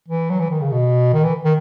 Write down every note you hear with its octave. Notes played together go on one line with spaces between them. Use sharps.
E3
F#3
E3
D#3
C#3
B2
D#3
E3
D#3